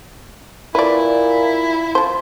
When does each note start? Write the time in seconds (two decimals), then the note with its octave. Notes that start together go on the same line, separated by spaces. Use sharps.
0.75 A#2 E4 B4 D5
1.95 F3 C5